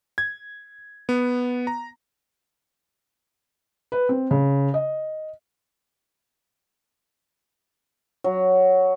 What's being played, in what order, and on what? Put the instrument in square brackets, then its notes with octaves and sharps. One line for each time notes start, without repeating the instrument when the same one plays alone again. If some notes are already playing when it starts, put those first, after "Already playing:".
[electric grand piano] G#6
B3
A#5
[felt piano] B4
C4
C#3
D#5
[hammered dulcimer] F#3